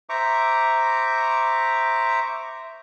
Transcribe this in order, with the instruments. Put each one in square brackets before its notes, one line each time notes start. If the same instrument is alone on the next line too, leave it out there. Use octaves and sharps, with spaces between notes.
[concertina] C5 E5 A#5 C#6 D6